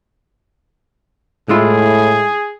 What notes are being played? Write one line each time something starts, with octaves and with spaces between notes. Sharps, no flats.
A2 G#3 E4 F4 G#4